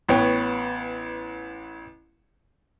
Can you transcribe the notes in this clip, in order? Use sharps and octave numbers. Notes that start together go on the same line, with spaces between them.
A1 B3 C#5 G5